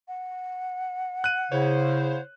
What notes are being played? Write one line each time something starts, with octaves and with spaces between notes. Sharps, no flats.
F#5
F#6 D#7
C#3 E4 C5 C#5